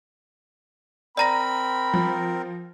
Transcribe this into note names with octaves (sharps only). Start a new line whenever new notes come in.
C4 A#4 D5 A#5 B5 A#6
F3